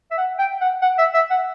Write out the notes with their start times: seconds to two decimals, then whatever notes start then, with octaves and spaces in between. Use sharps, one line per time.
0.11 E5
0.18 F#5
0.39 G5
0.61 F#5
0.82 F#5
0.98 E5
1.14 E5
1.30 F#5